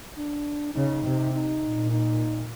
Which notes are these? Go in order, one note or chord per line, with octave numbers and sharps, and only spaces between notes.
D4
C#3 D#4
C3
D#4
A#2
D#4